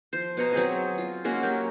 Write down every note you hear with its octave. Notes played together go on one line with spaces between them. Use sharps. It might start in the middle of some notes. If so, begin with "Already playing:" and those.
F3 C5
B2 C#5 D#5 A#5
F#3 C4 G#4 D#5
F4
G#3 A#3 C#4 F#4
F#3 G4 A#4